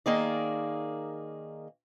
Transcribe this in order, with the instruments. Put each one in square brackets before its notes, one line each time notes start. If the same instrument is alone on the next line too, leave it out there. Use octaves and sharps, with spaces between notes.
[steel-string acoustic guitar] D#3 A#3 G#4 D5